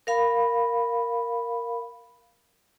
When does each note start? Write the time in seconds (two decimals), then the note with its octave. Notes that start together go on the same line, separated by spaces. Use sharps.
0.07 A#4 F5 B5